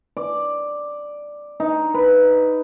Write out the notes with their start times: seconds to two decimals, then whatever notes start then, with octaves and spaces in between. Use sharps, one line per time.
0.17 D5
1.60 D#4
1.94 B4